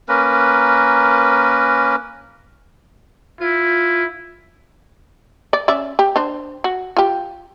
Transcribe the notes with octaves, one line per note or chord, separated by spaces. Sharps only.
A#3 C#4 A#4 B4
E4 F4
D5
C#4 D5 E5
G4
D4 C5
F#4
F4 G4